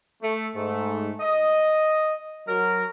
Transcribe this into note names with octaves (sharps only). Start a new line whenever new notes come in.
A3
G#2 A3
D#5
F#3 A#4